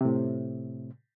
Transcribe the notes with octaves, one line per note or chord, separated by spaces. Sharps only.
A2 C3